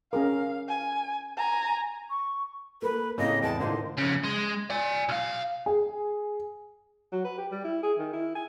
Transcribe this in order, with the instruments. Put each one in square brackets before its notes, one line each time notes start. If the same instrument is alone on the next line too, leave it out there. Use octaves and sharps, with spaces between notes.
[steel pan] C#4 G#4 A#4 [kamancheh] F5
[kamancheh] G#5
G#5 A#5
[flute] C#6
[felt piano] A3 A#3 [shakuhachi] B4
[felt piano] A2 C4 [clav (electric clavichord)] C#3 A#3 [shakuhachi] D#5
[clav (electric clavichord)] E2 G#3 G5 [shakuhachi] A5
[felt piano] A2 D#3 [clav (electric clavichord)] D3 A#3 D#4 [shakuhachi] C5
[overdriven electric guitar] F2 C#3
G#3
D5 G#5
B1 F5
[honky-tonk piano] G#4
[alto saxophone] F#3
B4
G4
G3
E4
G#4
D#3
E4
G#5